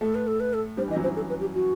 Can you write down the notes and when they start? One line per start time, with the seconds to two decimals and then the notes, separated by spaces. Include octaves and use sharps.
0.01 A2 A3 A4
0.15 B4
0.27 A4
0.40 B4
0.54 A4
0.77 G2 G3 C5
0.88 E3
0.91 D#5
0.96 F#2 F#3
1.03 C5
1.06 F#2 F#3
1.16 A4
1.29 B4
1.41 G4
1.54 F#4